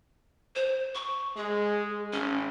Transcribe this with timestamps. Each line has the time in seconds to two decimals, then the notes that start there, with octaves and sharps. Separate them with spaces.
0.55 C5
0.95 C#6
1.37 G#3 G#4
2.13 G#1 C#4